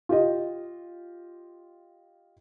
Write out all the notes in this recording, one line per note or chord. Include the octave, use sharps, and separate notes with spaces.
F4 G4 D#5